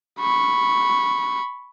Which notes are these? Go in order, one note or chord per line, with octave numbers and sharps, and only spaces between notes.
B5 C#6